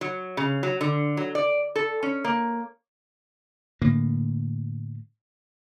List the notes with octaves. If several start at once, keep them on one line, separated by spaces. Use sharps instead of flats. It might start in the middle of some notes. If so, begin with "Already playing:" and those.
F#3
C#3
F#3
D3
F#3
D5
A4
C#4
A#3
A2 D3 A#3